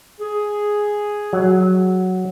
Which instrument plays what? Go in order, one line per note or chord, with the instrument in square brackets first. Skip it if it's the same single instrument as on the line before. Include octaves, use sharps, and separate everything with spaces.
[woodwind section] G#4
[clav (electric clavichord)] F#3